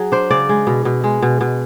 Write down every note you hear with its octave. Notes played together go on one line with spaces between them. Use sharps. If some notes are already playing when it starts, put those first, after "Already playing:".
Already playing: F#3 G#4
D4 C5
C#3 D5
G#3
B2
B2
G#3
B2
B2